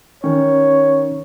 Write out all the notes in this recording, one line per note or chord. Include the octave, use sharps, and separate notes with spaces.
D#3 C#4 C#5